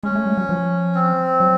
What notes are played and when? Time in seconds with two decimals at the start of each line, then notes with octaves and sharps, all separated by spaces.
0.03 G#3 C#4
0.15 A3
0.26 G3
0.37 F#3
0.49 F3
0.95 C4
1.40 F#3